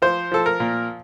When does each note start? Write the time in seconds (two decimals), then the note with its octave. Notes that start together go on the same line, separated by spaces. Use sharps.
0.02 F3 C5
0.32 F3 A4
0.46 A#4
0.60 A#2